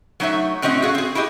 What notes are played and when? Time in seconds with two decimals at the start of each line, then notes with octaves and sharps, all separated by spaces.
0.20 F#3 A3 D#4 C#5 E5
0.62 A2 C4 C#4 F#4 D#5 E5
0.82 F#4 G#4 F5
0.95 C4 G#4
1.15 E4 F#4 G4 D#5